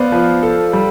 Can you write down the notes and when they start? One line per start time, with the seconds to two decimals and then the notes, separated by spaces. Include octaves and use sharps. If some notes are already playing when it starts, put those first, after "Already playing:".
Already playing: B3 C5 D5 F5
0.12 F3 B4
0.43 A4
0.73 G3